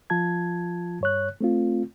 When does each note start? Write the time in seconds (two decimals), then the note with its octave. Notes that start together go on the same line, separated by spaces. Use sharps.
0.10 F3 F4 A5 G#6
1.01 G2 C#5 F#6
1.41 A3 C4 F4